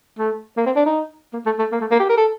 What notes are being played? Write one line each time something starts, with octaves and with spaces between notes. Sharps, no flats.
A3
A#3
C4
D4
D#4
A#3
A3
A3
A#3
A3
A#3
G4
A#4
A4